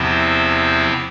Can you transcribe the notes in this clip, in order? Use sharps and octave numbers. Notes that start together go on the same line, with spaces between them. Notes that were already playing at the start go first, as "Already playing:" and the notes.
Already playing: E2 C3 F3 C4 E4